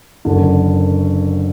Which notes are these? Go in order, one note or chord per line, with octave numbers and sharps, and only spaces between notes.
F#1 F#2 D3